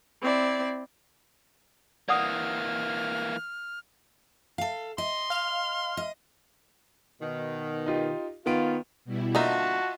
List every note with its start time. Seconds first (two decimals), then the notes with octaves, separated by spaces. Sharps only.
0.23 C4 E4 D5
2.09 E3 A#3 D5 F#5 D#6 F6
4.58 A4 F5
4.98 D#5 C6
5.30 F5 F6
5.97 D#5
7.22 B2 D#3
7.86 D#4 F4 G4
8.46 D#3 B3 F4 D7
9.05 B2 G3 E4
9.35 D3 A#3 D#4 F4 F#4 D#5 E5 A5